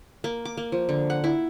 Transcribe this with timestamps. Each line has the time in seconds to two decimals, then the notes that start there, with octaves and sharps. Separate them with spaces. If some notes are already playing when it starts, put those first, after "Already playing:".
0.24 A#3
0.45 D6
0.57 A#3
0.72 F3
0.89 D3
1.10 F#5
1.24 E4